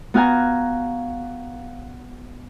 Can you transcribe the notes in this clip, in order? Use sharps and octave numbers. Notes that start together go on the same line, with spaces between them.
B3 F#4 F5 G#5 A#5